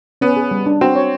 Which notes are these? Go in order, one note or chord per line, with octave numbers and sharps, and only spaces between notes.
B3 C#4
G#4
G3
D4
C4 F#4
C#5